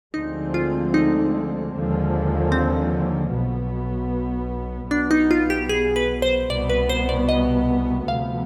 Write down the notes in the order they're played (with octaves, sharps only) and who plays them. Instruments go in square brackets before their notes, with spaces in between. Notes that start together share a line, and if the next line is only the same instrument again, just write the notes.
[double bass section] D2 D3 F3 G#3 C4 [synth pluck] D#4
[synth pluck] F4
D#4
[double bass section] D#2 D3 F3 G#3
[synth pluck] C4
[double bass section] B1 B2 B3
[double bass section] B1 B2 B3 [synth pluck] D4
[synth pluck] D#4
F4
G4
G#4
B4
C5
[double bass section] C2 B2 B3 [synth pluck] D5
[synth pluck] B4
C5
D5
D#5
[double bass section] D2 C3 F3 B3 [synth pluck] F5